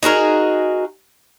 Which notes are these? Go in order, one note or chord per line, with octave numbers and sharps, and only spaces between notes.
D#4 F#4 G#4 A#4